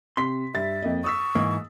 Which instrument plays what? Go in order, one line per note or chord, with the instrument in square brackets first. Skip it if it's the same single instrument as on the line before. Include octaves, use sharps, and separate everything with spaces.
[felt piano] C3 B6 [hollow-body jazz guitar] C6
[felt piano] G2 A6 [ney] E5
[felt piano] F2 A#3 D#5
[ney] C#6 [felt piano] D#6 E6 B6
[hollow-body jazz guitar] G#2 E3 A#3